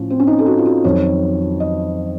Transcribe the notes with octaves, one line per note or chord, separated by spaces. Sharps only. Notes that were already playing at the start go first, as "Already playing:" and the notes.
Already playing: A2 F3 C#4
C4
C#4
D#4
A4
F#4
F4
F#4
F2 D#3 F#3 C#5
D#5